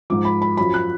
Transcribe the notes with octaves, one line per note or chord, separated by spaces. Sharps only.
G#2 F3 D6
B5
B5
F#2 F3 B5
F#6